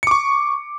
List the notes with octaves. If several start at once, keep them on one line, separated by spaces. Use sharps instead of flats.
C#6 D6 C#7